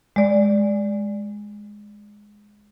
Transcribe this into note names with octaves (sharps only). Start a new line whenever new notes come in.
G#3 D5